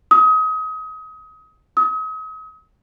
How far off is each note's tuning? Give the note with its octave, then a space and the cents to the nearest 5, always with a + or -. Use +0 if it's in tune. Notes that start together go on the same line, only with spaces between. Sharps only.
D#6 +30
D#6 +40